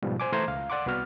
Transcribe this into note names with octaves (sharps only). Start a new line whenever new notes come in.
G#2 B2 F3 G3
C5 G#5 D6
E3 A3 C5 A#5 C6 G#6
C#2 F5
D5 F#5 C6 D6
C2 B3 F#4 F6